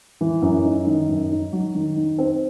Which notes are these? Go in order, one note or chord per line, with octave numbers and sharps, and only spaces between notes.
E3
F#2
D#4
D#3
F#2
D#4
F#3
D#3
D#4
C4